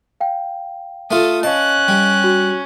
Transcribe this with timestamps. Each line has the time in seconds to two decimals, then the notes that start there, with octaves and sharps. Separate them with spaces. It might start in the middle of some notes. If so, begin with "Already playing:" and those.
0.20 F5 G5
1.11 A3 F4 A4 D#6
1.43 C#4 D#5 F5 A5 F#6
1.88 G3
2.24 F#4